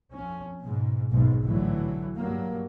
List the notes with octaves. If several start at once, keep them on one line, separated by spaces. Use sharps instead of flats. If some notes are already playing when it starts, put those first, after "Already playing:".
F2 C#4
G#2 B2
F#1 B1 G#2 B2
A2 D3 E3 F#3
G2 F#3 A#3